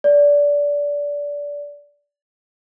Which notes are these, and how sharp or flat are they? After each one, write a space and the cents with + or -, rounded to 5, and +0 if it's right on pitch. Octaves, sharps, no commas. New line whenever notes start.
D5 -20